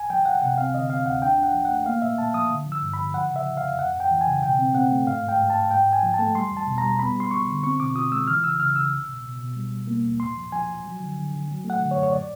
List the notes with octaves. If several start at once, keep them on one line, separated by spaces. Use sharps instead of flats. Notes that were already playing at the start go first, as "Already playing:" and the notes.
Already playing: C2 G#5
F3 G5
C2 F#5
C3 F#5
C4 F5
D3 D#5
C4 F5
D2 F#5
D4 G5
D4 F#5
F3
A3 F#5
A#3 F5
A#2 E5
A#2 A5
F3 D#6
D3
F3
E6
G2
D3 B5
F3 F#5
C#3
E5
F3
F5
F2
F2 F#5
F2
G5
E3
G#5
C#3
B2 G5
C4
C4 F#5
A3
G#2 F5
G#2
G5
G#2
A5
G#2
G#2 G5
G#2
G#5
F3
A5
A3
G3 C6
E2
A5
B2
A#5
G3
B3 B5
G3 C6
G3 C#6
D3
C4 C#6
B2 D6
F4 D#6
G#3 E6
E3 F6
C#3 E6
C#3 F6
C#3 E6
C2
B2
B2
B2
G3
G3
A#3
D#2
A#2 C6
F3
F3 G#5
F3
F#3
D3
D3
D3
F#3
A3
F#5
D3
C#5
F#2
C#5
A#2 D5